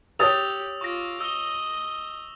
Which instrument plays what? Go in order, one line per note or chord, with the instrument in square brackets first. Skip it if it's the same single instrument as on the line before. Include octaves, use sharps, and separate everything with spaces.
[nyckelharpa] G4 [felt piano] C#5 D#6 A6 [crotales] E6 F7
[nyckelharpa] F4 D6 [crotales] C#6 A#6
[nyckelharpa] D#5 [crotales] E6 G7